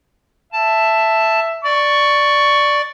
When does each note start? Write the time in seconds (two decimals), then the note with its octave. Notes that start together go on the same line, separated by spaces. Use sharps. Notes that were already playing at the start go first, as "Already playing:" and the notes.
0.53 E5 A5
1.64 D5 C#6